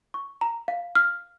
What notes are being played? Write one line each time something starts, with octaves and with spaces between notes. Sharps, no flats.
C#6
A#5
F5
F6